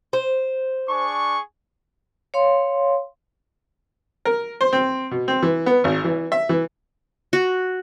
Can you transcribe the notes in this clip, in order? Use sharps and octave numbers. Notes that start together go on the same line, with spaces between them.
C5
D4 G#4 C#6
C#5 F5 C6
A#4
C5
C4
B2
C4
E3
B3
G#1
E3
E5
E3
F#4